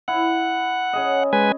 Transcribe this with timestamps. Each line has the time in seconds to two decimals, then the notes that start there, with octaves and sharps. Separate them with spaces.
0.08 E4 F#5
0.93 C#4 G#4 D#5
1.33 G#3 B4 G#5